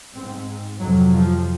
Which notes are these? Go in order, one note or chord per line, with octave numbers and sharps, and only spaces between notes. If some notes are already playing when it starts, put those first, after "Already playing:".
G#2 C4
F2 C3 F#3
F3